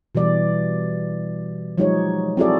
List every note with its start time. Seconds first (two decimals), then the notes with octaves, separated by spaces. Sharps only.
0.15 B2 E3 G3 D5
1.78 F3 F#3 G#3 D#4 G4 C#5
2.37 C4 E4 F#4 G#4 A4 D5